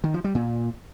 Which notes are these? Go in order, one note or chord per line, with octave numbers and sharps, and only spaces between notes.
D#3
F3
G3
A#2